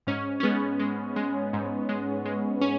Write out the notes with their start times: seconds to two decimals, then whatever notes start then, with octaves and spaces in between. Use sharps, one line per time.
0.07 G#2 C#4
0.40 C#4
0.43 G#3 B3
0.79 G#3
1.16 G#3
1.53 G#2
1.89 G#3
2.25 G#3
2.61 C#4